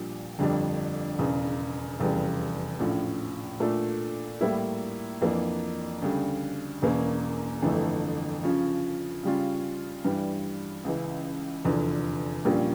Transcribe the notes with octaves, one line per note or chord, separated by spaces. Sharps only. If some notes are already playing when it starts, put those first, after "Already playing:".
Already playing: A#1 A#2 G3
G1 F2 D3 G3 D4
E1 E2 C#3
F1 E2 C#3 G3
A#1 A2 F3 C#4 F4
A#2 A3 D4 A4
A2 G3 A#3 E4
F2 E3 A#3 D4
D2 C#3 G3
E1 E2 E3 A#3 C#4
G1 F2 E3 A3
C#3 F3 C#4
C#3 G3 C#4 F4
G2 E3 G3
C#2 C#3 E3
F1 E2 D3 F3
A#1 A#2 G3 A#3 C#4